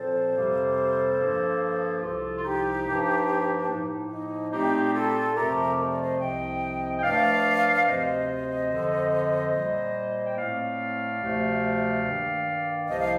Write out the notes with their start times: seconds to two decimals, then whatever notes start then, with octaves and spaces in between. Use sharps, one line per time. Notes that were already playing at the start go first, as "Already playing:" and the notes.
Already playing: A#2 F3 C4 A4 C5
0.34 F2 C3 G3 A#3
1.18 G2 F3 A#3
1.96 G4
2.01 C2 C3 F3 F4 A4
2.36 F4
2.44 D#4 G4
2.85 G2 F3 A#3
3.59 D4
3.69 A2 F3 A#3 D#4
4.11 D#4
4.52 A#2 A3 C4 D#4 G4
4.94 F4 A4
5.35 F2 C3 F3 A3 C4 G4 A#4
5.77 D#5
5.89 D5
6.02 C5 D#5
6.19 C2 C3 F3 C4 D#5 G5
6.98 G5
7.03 G2 F3 A3 D5 F5
7.87 D2 C3 F3 C4 C5 D#5
8.70 F2 D3 F3
9.53 A#2 G3 A#3
10.25 G5
10.37 A2 A3 C4 D5 F5
11.20 D2 C3 F3 A3
12.04 G2 D#3 A#3
12.88 C2 C3 F3 A#3 D#5
13.00 F5